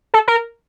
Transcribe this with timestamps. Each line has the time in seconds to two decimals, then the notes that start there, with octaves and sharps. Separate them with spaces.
0.14 A4
0.28 A#4